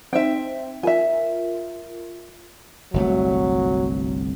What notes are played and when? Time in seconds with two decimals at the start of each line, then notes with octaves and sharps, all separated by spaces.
0.13 C4 D#4 C5 E5 G5
0.83 F4 A#4 E5 G#5
2.94 G1 C2 F#3 A3